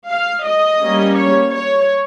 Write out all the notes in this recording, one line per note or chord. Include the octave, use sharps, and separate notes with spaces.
F5
D#5
G3 A#3 C#4
C#5
C#5